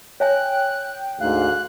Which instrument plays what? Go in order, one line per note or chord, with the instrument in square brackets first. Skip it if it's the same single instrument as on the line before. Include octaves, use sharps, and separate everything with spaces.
[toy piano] C#5 E5 G#5 [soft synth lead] G5 [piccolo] F#6
[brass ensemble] D2 G#2 [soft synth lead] F5 [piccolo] F#6